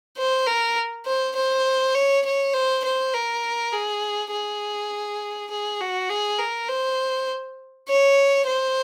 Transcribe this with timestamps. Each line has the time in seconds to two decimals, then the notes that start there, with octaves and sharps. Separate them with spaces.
0.17 C5
0.47 A#4
1.06 C5
1.36 C5
1.95 C#5
2.25 C#5
2.54 C5
2.84 C5
3.14 A#4
3.72 G#4
4.31 G#4
5.50 G#4
5.80 F#4
6.10 G#4
6.39 A#4
6.69 C5
7.88 C#5
8.47 C5